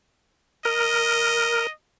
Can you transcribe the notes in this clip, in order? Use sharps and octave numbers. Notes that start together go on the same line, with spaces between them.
A#4 D#5